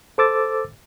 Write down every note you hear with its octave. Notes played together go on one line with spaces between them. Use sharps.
A4 C5 D6 E6 A6